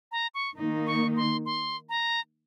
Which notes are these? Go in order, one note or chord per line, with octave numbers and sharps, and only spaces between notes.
A#5
C#6
D#3 A#3 D#4
C#6
C6
C6
A#5